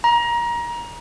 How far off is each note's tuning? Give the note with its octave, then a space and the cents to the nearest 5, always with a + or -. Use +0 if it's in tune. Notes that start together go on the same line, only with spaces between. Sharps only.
A#5 +25